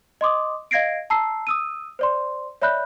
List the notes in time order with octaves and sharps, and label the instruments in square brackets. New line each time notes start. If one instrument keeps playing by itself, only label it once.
[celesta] D#5 C6 D6 D#6
D#5 F5 G#6 A#6 C7 D7
A5 A#5 E6 C7
D#6 E6 D#7
C5 D5 C6
C#5 D5 E5 B5 F#6 G6